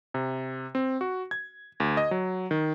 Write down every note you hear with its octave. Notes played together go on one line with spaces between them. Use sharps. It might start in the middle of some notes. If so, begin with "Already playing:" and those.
C3
C4
F#4
G#6
D2
D#5
F#3
D#3